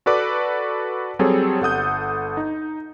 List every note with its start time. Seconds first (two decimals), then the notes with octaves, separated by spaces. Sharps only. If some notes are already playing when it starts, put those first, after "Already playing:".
0.06 F#4 A4 B4 D5 D6
1.19 F#3 G3 C4 G#4 A4 C#5
1.61 G1 A4 F#5 D#6 G6
2.37 D#4